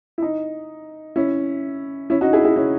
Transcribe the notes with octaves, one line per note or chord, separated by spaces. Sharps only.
E4
D#4
C#4 E4
C#4 E4
D#4 F#4
E4 G#4
E4 G#4
C#4 E4